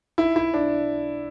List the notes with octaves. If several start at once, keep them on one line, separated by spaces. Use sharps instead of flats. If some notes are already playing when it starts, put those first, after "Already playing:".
E4
E4
D4